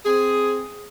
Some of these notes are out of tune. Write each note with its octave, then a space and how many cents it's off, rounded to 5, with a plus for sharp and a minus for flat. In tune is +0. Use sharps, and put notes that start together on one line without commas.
C4 +0 G#4 +5